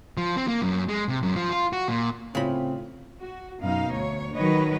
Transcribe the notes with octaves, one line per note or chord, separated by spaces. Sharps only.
F3
C4
A#3
F#2
G#3
C3
F#2
F3
F4
F#4
A#2
A2 C#3 C4 F4 B5
F#4
F#2 B2 D#4 F5
D2 C#5
D#3 F#3 B4 C#5 D#5